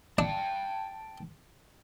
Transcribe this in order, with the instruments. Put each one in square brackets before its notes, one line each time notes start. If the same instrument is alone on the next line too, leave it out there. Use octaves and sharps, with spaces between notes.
[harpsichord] D4 [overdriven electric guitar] G5 A5